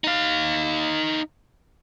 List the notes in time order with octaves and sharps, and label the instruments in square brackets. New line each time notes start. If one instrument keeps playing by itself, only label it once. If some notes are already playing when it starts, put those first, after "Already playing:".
[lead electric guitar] D#4 F5